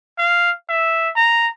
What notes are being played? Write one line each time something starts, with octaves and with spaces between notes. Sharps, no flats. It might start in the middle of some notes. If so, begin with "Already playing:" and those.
F5
E5
A#5